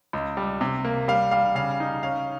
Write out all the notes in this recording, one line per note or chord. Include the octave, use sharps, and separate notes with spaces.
C#2
G3
C3
A#3
G3 F5
G3 F5
C#3 F5
D#4
C#4 F5